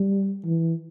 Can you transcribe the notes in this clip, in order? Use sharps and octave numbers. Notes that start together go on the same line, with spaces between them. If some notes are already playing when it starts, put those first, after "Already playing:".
Already playing: G3
E3